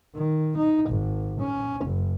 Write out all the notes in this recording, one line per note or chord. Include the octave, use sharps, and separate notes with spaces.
D#3
D#4
G#1
C#4
F#1